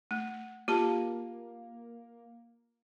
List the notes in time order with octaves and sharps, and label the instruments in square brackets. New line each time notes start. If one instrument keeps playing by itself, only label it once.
[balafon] A3
[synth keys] A#3 [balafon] F4 G4 A5